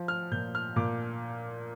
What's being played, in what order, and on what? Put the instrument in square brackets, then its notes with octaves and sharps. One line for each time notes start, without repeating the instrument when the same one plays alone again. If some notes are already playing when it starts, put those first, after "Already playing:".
Already playing: [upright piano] F3
F6
A#2 G6
F6
A#2 D6